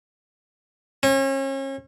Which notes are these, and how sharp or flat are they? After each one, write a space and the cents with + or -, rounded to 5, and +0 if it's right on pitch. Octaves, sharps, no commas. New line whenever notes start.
C#4 -35